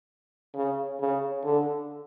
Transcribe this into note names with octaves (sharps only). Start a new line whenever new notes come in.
C#3
C#3
D3